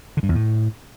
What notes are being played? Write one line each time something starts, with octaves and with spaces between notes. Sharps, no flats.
D3
G2
E2
A2